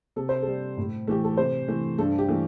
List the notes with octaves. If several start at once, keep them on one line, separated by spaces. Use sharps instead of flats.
C3 A4
C5
G3 A4
A2
E3 A3 G4
A4
C3 C5
E3 A3
G2 A4
G4
E3 A3